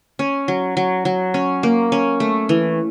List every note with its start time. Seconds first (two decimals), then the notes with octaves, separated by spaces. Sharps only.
0.19 C#4
0.48 F#3
0.77 F#3
1.05 F#3
1.34 C#4
1.63 A#3
1.92 C#4
2.20 A3
2.49 E3